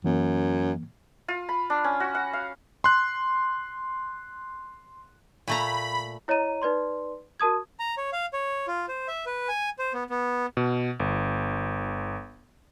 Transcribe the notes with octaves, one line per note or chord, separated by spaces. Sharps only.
F#2 E3 A#3
F4
B5
D4
C#4
F#4
F#5
F5
C6 F#6
A#2 A3 A#5 B5
E4 C#5 D#5 A#5 D#7
D#4 B4 D5 C6
F#4 A#4 A5 D#6 G#6
A#5
C#5
F5
C#5
F4
C5
E5
B4
G#5
C5
B3
B3
B2
G1